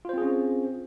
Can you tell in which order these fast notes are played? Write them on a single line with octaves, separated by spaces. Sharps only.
F4 C5 C4 G#4 C#4